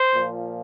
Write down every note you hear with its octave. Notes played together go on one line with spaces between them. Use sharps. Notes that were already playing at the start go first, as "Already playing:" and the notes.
Already playing: C5
A#2 F3